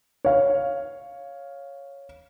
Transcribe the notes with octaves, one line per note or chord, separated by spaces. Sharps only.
C#5 F5